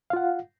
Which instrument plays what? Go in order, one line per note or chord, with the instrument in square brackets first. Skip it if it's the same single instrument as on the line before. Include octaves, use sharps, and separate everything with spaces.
[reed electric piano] F5
F4
F#5